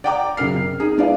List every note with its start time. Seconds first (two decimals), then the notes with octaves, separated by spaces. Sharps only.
0.04 D5 F#5 G5 A#5 D6
0.37 F#2 C#3 A#4 F6 C7
0.55 C3
0.80 D#4 G#4
0.98 G#3 B3 D4 E4 D5 F5